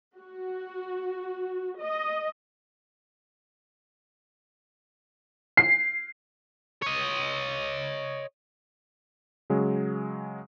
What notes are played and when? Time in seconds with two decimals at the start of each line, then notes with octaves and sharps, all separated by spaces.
0.18 F#4
1.80 D#5
5.57 C7
6.82 C#5 D#5
9.50 C#3 F#3 G#3